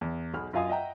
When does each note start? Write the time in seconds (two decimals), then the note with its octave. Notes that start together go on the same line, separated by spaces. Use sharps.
0.01 E2
0.34 B1 G#4 B5 F6
0.53 F#2 F4 D#5 F5 G#5 D#6
0.69 D#5 E5 F#5 G5 A#5